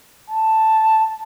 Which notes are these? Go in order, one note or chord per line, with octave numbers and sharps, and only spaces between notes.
A5